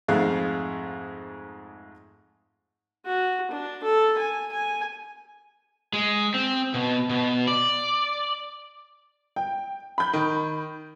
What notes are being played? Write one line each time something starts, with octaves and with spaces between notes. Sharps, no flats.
F2 G#2 G#3 A3 F5 F#6
F#4
D4
A4
G#5
G#5
G#3
C4
B2
B2
D5
G5
B5 G6
D#3